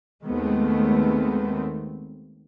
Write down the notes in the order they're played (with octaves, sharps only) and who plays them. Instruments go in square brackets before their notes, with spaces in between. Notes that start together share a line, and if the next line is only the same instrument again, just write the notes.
[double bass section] D#2 D#3 G#3 A3 B3 C4